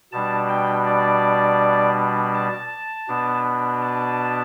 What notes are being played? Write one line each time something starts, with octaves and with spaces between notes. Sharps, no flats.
B2 G3 D4 A5
G5
D5
A5
B2 B3 D4
A5